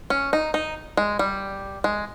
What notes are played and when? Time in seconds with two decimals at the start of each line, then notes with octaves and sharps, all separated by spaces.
0.10 C#4
0.33 D#4
0.54 D#4
0.97 G#3
1.19 G3
1.84 G#3